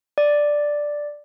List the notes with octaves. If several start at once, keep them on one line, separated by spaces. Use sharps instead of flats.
D5